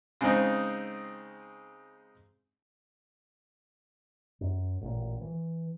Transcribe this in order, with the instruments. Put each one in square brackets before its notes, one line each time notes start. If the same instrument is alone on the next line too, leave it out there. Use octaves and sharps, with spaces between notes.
[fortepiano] C#3 G#3 C4 D#4
[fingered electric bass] F#2
A1 A#2
E3